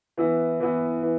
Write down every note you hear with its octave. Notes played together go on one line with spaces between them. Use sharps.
E3 B3 E4
E3 B3 E4
E3